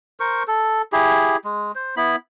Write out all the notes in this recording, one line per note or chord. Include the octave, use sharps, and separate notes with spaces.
A#4 C5 C#6
A4
E4 G4 G#4
G#3
C5
B3 E4 B5